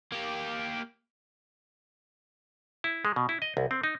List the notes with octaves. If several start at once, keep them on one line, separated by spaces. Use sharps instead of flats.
A#3 G4
E4
G#3
B2
E4
D#5
C2
C4
D#4